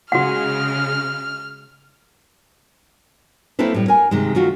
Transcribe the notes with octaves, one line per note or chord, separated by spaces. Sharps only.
C#3 G#3 F#4 F#5 F6
A3 A#3 C4 E4 A4 B4
A2 G3
A#4 G#5
C3 D#3 G#3
D#3 A3 F4 F#4